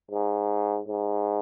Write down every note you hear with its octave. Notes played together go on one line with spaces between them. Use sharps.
G#2
G#2